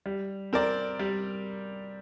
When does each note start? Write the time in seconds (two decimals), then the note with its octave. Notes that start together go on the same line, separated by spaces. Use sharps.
0.06 G3
0.53 C4 A#4 D5
0.99 G3